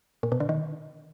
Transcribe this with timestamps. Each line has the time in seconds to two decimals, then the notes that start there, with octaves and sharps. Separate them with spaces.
0.23 A#2
0.32 B2
0.40 D3
0.49 D#3